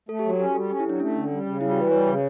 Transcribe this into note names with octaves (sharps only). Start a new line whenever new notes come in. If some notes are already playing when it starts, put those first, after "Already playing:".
A3 A4
F#3 G4
F#4
C#4 G4
G3 A4
C#4 G4
E4
F#3 D4
A3 C#4
D3
G3
C#3
G3 E4
E3 F#4
B4
G3 C#5
C#3